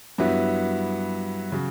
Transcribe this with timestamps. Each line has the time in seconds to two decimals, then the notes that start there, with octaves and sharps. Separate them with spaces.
0.18 G2 F#3 B3 E4
1.52 C#3 F#3